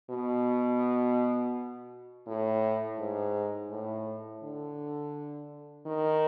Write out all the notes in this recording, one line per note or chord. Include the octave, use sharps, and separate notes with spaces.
B2
A2
G#2
A2
D3
D#3